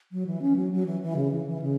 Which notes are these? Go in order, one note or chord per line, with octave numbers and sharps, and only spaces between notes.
F#3
E3
C#4
F#3
F#3
E3
E3
C#3
E3
E3
C#3